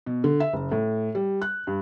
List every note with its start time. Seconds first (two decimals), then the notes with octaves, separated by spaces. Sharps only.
0.06 B2
0.24 D3
0.40 E5
0.53 F#1
0.72 A2
1.15 G3
1.42 F#6
1.67 G2